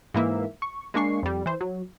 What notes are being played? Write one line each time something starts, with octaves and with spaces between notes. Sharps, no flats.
G#2 E3 A#3 E5
C#6
G#3 A#3 D4 C#6 C7
F2 G3
E3 C5
F#3